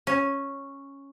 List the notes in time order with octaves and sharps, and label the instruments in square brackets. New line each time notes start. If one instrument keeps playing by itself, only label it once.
[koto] C#4